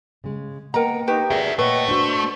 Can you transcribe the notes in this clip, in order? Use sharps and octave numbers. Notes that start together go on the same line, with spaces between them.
C#3 G#3
A#3 B3 A#4 D#5 F#5 G5 A#5
D#4 G4 B4 C#6
F#4 G#4 A#4 D5 E5
A#2 A3 B4 C#5 D#5 F#5 G5
D4 F#4 C5